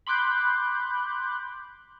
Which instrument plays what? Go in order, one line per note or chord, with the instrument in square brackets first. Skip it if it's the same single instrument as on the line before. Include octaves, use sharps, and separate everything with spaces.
[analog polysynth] B5 C6 D6 F#6 G6